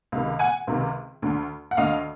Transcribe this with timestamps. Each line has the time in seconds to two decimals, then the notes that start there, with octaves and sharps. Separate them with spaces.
0.12 C#2 C3 D#3
0.39 F#5 G#5
0.67 C#2 C3 D#3
1.22 D2 D3
1.71 F#5
1.77 D2 D3 D#5 F5